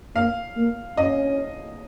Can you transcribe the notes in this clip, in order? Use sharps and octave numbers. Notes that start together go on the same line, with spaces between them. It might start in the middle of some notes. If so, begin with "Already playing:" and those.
A#3 F5
A#3
C#4 D#5